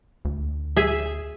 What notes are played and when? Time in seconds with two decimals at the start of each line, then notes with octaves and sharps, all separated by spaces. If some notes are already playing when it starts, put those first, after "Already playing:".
0.25 D2
0.77 G#4 E5